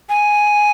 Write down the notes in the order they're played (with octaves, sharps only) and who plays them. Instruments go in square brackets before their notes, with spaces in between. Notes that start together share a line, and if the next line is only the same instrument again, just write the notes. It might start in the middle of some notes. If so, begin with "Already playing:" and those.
[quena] G#5